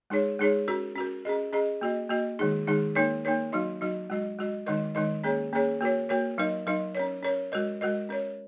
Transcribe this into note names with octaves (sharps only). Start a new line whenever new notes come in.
G#3 D#4 G#4 C#5
G#3 D#4 G#4 C#5
C#4 F#4 A#4
C#4 F#4 A#4
C#4 G#4 D#5
C#4 G#4 D#5
A#3 F#4 D#5
A#3 F#4 D#5
D#3 G#3 D#4 G#4
D#3 G#3 D#4 G#4
A#3 D#4 A#4 C#5
A#3 D#4 A#4 C#5
F#3 D#4 F#4 D#5
F#3 D#4 F#4 D#5
G#3 F#4 D#5
G#3 F#4 D#5
D#3 G#3 D#4 A#4 D#5
D#3 G#3 D#4 A#4 D#5
A#3 C#4 G#4 C#5
A#3 C#4 G#4 C#5
A#3 F#4 A#4 C#5
A#3 F#4 A#4 C#5
F#3 D#4 A#4 D#5
F#3 D#4 A#4 D#5
C#4 A#4 C#5
C#4 A#4 C#5
G#3 F#4 A#4 D#5
G#3 F#4 A#4 D#5
C#4 A#4 C#5